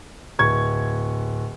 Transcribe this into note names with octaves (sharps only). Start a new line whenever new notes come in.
D1 C#6 G#6